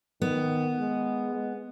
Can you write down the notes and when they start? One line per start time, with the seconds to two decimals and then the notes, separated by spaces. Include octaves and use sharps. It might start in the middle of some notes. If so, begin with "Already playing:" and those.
0.22 D#3 B3
0.79 G#3
1.34 G#3